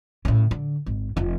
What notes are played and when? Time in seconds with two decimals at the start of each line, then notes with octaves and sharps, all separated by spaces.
0.25 A2 C#3
0.51 D3
0.86 G#1
1.17 F1 F4